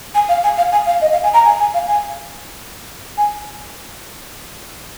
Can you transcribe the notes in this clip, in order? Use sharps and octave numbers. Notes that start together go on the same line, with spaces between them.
G#5
F5
G#5
F5
G#5
F5
D#5
F5
G#5
A#5
G#5
G#5
F5
G#5
G#5